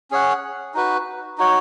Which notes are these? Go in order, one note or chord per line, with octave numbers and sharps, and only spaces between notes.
C#4 G#4 C#5 F#5
D#4 F#4 B4
D#4 F#4 C#5